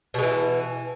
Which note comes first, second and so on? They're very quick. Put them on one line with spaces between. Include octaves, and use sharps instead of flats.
B2 G#3 E3